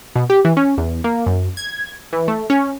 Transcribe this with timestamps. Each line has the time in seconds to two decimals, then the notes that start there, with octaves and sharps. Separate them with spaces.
0.15 B2
0.30 G4
0.45 E3
0.57 C#4
0.77 E2
1.04 A#3
1.26 F#2
1.57 G#6
2.13 E3
2.28 A3
2.50 C#4